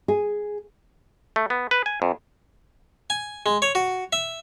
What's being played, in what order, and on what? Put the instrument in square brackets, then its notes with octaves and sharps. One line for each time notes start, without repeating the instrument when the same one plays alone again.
[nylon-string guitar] G#4
[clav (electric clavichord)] A3
B3
B4
G#5
F2
[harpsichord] G#5
G#3
C#5
F#4
E5